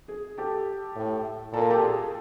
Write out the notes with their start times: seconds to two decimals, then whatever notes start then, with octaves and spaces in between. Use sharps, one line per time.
0.08 G#4
0.38 G4 A4
0.96 A2
1.53 A#2 A4
1.61 A#4
1.70 G4 A4
1.81 G#4